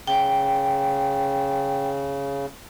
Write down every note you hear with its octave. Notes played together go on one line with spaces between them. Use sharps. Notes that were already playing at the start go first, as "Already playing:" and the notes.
C#3 G5